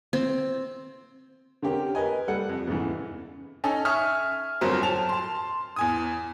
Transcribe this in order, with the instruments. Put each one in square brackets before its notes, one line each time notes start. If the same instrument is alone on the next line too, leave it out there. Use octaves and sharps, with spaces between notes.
[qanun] C4
[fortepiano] D3 C4 C#4 G4 A#4
A#4 B4 D#5 G#5
G3 A4 F#5
F2
E2 G#2 C#3 E3
[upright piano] C#4 D#4 A4
E5 G#5 C#6 D#6 F6
G1 F2 F#3 A#4 C5
A5 F7
A5 C6
E2 G#5 D#6